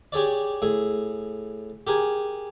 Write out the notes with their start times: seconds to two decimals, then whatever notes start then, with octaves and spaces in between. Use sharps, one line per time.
0.12 G4 G#4 C#5 D5
0.62 A2 G#4
1.87 G4 G#4 A#4 G#5